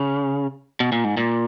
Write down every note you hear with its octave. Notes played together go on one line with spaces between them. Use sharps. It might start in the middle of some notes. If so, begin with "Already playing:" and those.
Already playing: C#3
B2
A#2
G#2
A#2